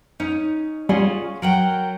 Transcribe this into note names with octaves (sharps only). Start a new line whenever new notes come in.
C#4 D#4
G3 C#4 F4 F#4 G#4
F#3 A#4 F#5 G5